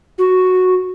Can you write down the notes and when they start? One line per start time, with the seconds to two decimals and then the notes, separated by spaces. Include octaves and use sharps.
0.18 F#4